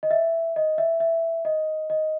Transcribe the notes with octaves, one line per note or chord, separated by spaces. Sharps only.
D#5
E5
D#5
E5
E5
D#5
D#5